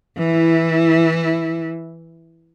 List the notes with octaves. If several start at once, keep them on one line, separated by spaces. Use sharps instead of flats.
E3 E4